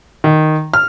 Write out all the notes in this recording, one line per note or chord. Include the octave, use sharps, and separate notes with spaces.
D#3
F6